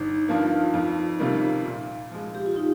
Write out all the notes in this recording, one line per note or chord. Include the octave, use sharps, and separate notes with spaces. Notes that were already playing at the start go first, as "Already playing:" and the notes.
Already playing: G1 D#4
G2 F3 A#3 F4
F2
C3 D#3 G3 A#3
A#2
F3 G#3
G4
F4
D#4